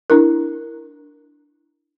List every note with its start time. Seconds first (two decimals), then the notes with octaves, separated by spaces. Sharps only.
0.10 D4 E4 A#4